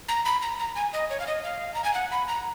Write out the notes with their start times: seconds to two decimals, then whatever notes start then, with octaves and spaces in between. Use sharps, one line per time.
0.08 A#5
0.25 B5
0.42 A#5
0.59 A#5
0.76 G#5
0.93 D#5
1.10 C#5
1.20 F5
1.27 D#5
1.44 F5
1.74 A#5
1.84 G#5
1.94 F#5
2.12 B5
2.28 A#5